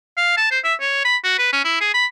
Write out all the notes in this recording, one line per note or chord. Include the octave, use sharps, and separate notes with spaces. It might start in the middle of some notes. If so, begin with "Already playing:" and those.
F5
A5
C5
E5
C#5
B5
F#4
B4
C#4
E4
G#4
B5